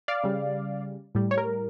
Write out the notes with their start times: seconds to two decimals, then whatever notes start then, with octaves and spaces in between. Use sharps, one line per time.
0.08 D5 F5
0.23 C#3 G3
1.15 A2 G3
1.31 C#5
1.38 A#4